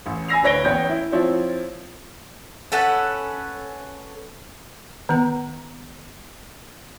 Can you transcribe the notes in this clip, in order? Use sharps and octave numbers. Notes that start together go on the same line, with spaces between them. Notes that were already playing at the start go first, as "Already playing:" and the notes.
A1
G#5 B5 E6 A#6 C7 F7
D1 B4 C#5 A#6 D7 G7
A1 B3 C#5 G5 G6
E4
F3 C4 E4 F4 C#5
C#4 A4 B4 F#5
D#3 B3 A#5